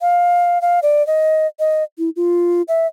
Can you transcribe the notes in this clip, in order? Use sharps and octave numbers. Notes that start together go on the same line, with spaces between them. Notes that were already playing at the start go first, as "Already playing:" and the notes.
F5
F5
D5
D#5
D#5
E4
F4
E5